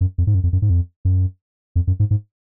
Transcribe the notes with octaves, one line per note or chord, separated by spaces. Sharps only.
F#2
F2
G#2
F#2
F2
F#2
G#2
F2
F#2
F2
F#2
G#2
G#2